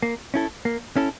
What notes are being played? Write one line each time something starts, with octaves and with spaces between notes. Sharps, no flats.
A#3
C#4 E4 A4
A#3
C#4 E4 A4